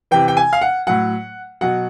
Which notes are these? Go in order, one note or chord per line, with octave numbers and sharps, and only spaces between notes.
C3 E3 G5
G5
G#5
F5
F#5
A2 F#3 F#5
B2 F#3 F#5